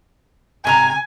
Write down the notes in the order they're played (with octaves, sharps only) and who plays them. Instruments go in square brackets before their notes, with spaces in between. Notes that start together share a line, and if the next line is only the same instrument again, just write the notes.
[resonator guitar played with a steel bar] G#2 C3 A#5 [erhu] G#5